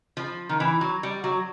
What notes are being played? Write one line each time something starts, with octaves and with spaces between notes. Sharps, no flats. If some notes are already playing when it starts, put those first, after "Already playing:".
F3
D#3
E3
F#3
G3
F#3